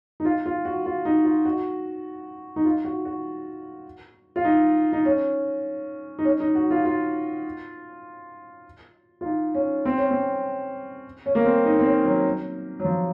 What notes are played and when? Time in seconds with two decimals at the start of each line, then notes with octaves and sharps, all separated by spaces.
0.20 D#4
0.25 F4
0.46 F4
0.65 F#4
0.86 F4
1.05 D#4
1.25 F4
1.45 F#4
2.56 D#4
2.65 F4
2.85 F#4
3.05 F#4
4.36 F4
4.45 D#4
4.93 D#4
5.05 C#4
6.19 D#4
6.25 C#4
6.40 D#4
6.55 F#4
6.71 F4
6.85 F4
9.21 F4
9.25 D#4
9.55 C#4
9.85 C4
9.98 C#4
10.11 C4
11.26 C#4
11.35 A#3
11.46 C4
11.65 D#4
11.79 C4
11.85 C#4
12.05 F#3
12.79 F#3
12.85 F3